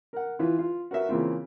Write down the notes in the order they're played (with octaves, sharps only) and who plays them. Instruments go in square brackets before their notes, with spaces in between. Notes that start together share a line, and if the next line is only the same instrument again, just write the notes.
[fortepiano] A#4 F#5
E3 E4 F4 B4
F4
F#4 A#4 B4 E5
C#3 E3 A#3 C4 F4